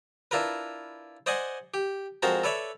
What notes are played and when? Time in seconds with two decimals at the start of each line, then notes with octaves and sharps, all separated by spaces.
0.31 D4 E4 F4 A#4 B4
1.26 C5 D5 D#5 F#5 G#5 C6
1.74 G4
2.22 F2 G#3 F#4 A#4 C5 A5
2.43 A4 B4 C#5 D5 E5